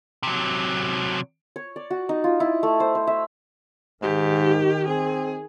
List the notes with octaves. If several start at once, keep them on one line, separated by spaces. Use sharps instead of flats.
C3 F#3
C#5
D5
F#4
D#4
F4
E4
A3
C5
C5
E5
G#2 D#3 G4
C4 G#4